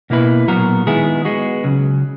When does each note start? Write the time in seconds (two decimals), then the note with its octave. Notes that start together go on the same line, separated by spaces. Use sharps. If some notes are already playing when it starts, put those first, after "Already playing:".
0.10 B2 A#3 E4 B4
0.48 A#2 F#3 B3 F#4 A#4
0.86 D#3 G#3 B3 E4 G#4
1.25 G#3 B3 F#4
1.64 C#2 C#3 F#3